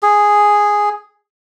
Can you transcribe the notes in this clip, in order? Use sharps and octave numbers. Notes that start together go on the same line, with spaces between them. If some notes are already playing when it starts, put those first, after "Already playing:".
G#4